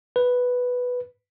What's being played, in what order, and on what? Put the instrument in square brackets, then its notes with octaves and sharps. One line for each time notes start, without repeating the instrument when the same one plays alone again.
[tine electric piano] B4